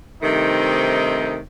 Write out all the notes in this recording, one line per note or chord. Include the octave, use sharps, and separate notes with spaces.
G2 C3 D#3 A3 C4 D#4